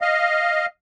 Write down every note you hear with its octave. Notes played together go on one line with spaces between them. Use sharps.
D#5 F5